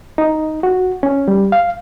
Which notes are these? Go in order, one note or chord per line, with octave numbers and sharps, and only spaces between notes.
D#4
F#4
C#4
G3
F5